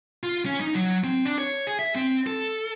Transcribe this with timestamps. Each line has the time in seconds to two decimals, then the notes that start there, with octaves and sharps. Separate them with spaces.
0.23 F4
0.46 C#4
0.60 D#4
0.75 F#3
1.04 C4
1.25 D4
1.39 C#5
1.67 G#4
1.79 E5
1.95 C4
2.27 A4